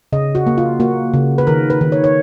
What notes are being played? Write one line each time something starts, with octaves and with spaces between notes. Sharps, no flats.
C#3 D#5
F#4
A#3
F4
A#3 F#4
C#3
B4
D#3 A#4
B4
D#3
C#5
C#5